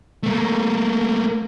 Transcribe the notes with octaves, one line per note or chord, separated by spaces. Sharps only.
A3 A#3